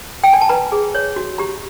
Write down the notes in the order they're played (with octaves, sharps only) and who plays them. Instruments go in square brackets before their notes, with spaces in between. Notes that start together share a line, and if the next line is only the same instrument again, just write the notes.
[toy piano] G5
G#5
A5
B4 A#5
G#4
C#5
F#4
G4 A#5